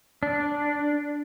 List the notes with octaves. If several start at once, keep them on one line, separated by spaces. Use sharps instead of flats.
D4